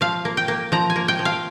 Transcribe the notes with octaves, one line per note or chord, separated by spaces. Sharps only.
F3 F5
A#3
G5
A#3
F3 A#5
G#5
A#3
G5
F3
F5